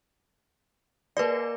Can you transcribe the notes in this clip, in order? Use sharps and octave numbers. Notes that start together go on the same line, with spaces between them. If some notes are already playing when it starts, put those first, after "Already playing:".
A#3 G#4 B4 D5 D#5